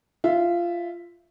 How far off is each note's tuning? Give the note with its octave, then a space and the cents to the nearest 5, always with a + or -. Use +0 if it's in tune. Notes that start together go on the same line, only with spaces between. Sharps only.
F4 -15 E5 +0